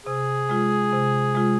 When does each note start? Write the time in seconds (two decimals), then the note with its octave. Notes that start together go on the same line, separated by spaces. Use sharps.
0.06 C3 G#4
0.49 G#3 F4
0.93 C3
1.35 G#3 F4